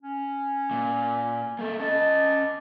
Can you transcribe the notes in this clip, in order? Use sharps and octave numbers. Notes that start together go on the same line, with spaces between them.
C#4
A#2
A#3 A4
C#4 D#5 A5